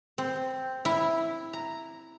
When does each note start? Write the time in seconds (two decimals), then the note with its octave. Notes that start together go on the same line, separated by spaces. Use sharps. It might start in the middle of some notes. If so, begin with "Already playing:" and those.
0.18 C4
0.85 E4
1.53 A#5